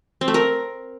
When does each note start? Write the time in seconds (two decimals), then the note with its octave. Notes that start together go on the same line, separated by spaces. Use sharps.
0.21 C4
0.28 A3
0.34 A#4